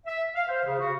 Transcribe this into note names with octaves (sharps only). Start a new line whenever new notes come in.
E5
F5
C5
C#3
F#4